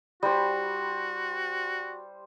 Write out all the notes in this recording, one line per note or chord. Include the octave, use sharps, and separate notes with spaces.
G3 F#4 C5